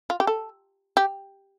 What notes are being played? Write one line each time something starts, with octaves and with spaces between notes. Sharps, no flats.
F4
G4
A4
G4